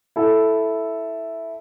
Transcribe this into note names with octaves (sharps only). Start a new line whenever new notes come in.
E4 A4